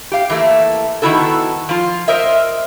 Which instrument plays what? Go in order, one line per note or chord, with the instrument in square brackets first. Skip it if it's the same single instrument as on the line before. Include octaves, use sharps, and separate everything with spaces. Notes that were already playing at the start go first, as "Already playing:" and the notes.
[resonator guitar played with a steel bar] G4 F5
E3 A3 A#3
D#3 F3 B3 E4 F#4 A4
F3 F4
A#4 C5 D#5 E5